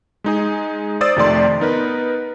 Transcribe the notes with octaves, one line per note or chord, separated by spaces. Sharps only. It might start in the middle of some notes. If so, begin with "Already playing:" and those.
G#3 D#4 G#4
C5 D5 D#6 E6 A6
F2 C3 D#3 A3 D5 C6
B3 D#4 A#4 B4